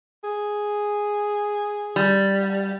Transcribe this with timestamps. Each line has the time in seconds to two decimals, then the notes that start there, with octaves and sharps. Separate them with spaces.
0.24 G#4
1.96 G3